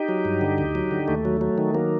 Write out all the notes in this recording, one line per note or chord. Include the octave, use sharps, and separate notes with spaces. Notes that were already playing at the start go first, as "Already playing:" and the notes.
Already playing: D#4 G4
F#3
G2
D3
D2
F#3
D3
D#2 A3
F#3
F#3
D#3
F#3 A#3